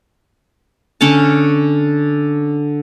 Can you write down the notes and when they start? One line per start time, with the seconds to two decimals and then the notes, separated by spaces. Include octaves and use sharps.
1.01 D3 C#4 C#5 A5